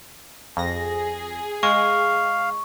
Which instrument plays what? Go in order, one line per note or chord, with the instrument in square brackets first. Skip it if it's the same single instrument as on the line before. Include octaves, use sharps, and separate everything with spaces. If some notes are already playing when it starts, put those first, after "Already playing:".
[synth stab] F2 A#6 [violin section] G#4
[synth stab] G#3 [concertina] F5 [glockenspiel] C#6